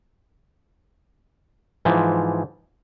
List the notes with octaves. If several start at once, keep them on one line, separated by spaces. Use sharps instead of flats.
G#2 E3 F3